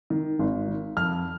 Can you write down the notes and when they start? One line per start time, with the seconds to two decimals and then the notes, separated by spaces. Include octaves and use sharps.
0.10 D#3
0.39 G#1
0.68 D#3
0.97 F2 F6